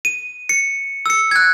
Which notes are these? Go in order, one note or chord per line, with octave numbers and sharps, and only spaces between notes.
D#7
C#7
E6 C#7
F#6 G#6